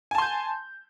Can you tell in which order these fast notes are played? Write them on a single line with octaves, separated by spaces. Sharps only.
G#5 A5 C6 G6